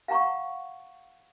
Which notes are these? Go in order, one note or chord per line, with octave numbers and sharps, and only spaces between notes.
F5 F#5 A#5 C#6